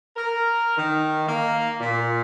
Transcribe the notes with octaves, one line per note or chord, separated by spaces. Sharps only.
A#4
D#3
A#3
A#2